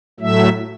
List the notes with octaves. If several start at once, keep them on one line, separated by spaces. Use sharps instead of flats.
A2 F#3 A3 E5